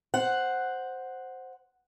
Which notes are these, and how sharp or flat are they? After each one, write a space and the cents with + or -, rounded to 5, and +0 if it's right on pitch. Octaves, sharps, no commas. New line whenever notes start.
C5 +0 F#5 +0